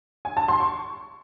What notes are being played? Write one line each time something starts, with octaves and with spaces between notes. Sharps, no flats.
G#5
A5
C6
C#6